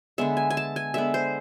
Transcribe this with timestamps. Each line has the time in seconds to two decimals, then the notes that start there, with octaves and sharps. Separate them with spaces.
0.18 D3 G#3 B3 E5
0.37 G#5
0.50 G#5
0.57 A5
0.76 G#5
0.94 D3 G#3 B3 E5
1.14 C5